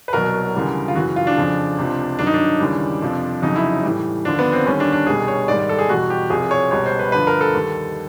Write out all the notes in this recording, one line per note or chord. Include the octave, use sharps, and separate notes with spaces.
B4
C2 B2 F#3 A#4
D2 C#3 E3 G3
F4
F#2 C#3 E3 F#4
F4
D4
F2 C#3 F3
C#2 C3 F3
G2 D#3 F#3 D4
D#4
D4
D#2 C#3 E3 G3
F2 C3 F3
F2 C#3 F#3 D#4
E4
A2 E3 G3
D#2 D3 F3 D4
B3
C4
D#2 D3 G3 C#4
D4
D4
C2 B2 G3 G#4
C#5
G#2 D#3 G3 D5
D5
A4
G#4
E2 B2 G3 F#4
G4
C2 C3 F3 G#4
C#5
C#2 B2 G3 C#5
C5
B4
G2 D3 F3 B4
A#4
A4
D#2 D#3 G3